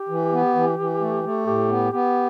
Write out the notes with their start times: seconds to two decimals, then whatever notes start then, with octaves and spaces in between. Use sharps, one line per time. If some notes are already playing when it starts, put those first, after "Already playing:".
Already playing: G4
0.09 E3
0.33 B3
0.55 E3
0.79 E3
1.01 A3
1.24 A3
1.46 A2 G4
1.69 B3
1.92 B3 G4